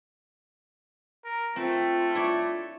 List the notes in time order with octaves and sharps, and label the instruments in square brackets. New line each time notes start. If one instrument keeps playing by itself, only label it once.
[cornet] A#4
[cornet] A3 [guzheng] C4 [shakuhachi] F4
[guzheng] E4 C#5 D5